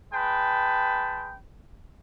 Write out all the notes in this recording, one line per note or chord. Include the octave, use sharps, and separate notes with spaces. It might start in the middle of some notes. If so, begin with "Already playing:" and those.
G#3 B4 G5 A5